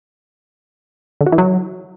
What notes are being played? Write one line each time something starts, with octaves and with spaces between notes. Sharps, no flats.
D3
F#4
E3
F#3